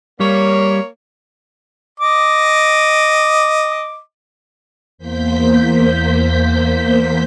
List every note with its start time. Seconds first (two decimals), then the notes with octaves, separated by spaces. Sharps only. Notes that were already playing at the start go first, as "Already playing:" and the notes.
0.20 G3 A#3 C#5
2.00 D#5 D6
4.98 E2 A#3 C5 G6 B6